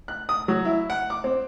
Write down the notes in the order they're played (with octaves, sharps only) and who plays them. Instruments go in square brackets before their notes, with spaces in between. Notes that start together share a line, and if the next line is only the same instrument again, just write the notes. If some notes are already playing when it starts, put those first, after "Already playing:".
[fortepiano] F#6
D#6
F#3
E4
F#5
D6
C4